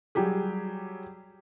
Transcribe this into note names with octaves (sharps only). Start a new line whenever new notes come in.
F#3 G3 G4 G#4